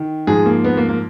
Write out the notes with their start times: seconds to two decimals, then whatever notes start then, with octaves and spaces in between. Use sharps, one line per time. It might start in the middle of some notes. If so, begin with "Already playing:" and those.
Already playing: D#3
0.27 G#2 F3 G#4
0.46 A#3
0.64 B3
0.77 A#3
0.89 A#3